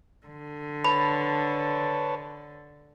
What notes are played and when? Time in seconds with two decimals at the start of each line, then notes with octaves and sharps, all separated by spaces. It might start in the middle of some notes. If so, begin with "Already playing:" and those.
0.27 D3
0.84 B4 C#5 A5 B5